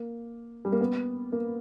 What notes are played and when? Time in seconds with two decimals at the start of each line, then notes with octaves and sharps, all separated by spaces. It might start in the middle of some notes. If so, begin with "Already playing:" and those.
Already playing: A#3
0.65 G3
0.72 A#3
0.80 B3
1.32 A#3